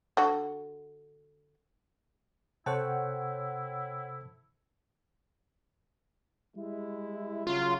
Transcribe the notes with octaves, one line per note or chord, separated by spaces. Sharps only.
D3 F#4
C3 E4 A4 C5 C#5 F#5 G5 A5
G3 G#3 E4
C#3 F#3 F4